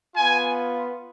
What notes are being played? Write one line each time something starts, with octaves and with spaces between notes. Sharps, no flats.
B3 F4 G#5